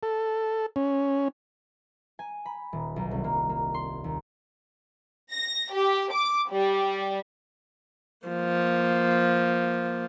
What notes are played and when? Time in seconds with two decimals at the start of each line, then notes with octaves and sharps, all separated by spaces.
0.03 A4
0.76 C#4
2.19 G#5
2.46 B5
2.73 D#1
2.96 B1
3.11 C2
3.24 A#3
3.49 A#3
3.74 C6
4.04 D#2
5.31 A#6
5.73 G4
6.13 D6
6.51 G3
8.27 F3 A#3